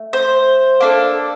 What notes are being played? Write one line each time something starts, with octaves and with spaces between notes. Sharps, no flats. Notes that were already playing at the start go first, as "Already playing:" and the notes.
Already playing: A3
C5
A#3 D4 A4